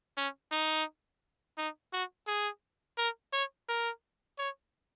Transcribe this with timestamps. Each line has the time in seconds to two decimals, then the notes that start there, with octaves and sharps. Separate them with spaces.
0.17 C#4
0.51 D#4
1.58 D#4
1.93 F#4
2.27 G#4
2.98 A#4
3.33 C#5
3.69 A#4
4.38 C#5